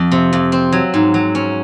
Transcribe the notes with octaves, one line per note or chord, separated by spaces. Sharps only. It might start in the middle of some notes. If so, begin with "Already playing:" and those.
Already playing: F2
C3
F2
C4
F#3
G#2
F#3
C#4